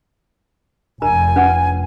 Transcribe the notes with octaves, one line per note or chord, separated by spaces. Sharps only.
F1 A#4 D#5 G#5 A#5
C#4 B4 F#5